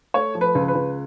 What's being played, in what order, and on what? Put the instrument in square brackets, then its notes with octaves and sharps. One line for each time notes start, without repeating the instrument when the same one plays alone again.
[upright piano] A3 C#5
F3
B4
C#2
B4
C#2